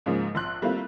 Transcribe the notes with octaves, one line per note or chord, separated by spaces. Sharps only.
G#2 C#3 F3 G#3 A#3
A#1 C6 F#6
G3 A3 A#3 C4 E4 F4